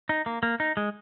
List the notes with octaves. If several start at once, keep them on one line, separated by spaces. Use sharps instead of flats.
D#4
A#3
A#3
D#4
G#3